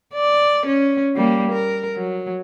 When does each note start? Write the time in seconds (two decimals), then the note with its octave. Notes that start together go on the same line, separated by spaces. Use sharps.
0.14 D5
0.66 C#4
1.16 G3 A#3
1.52 A#4
1.96 F#3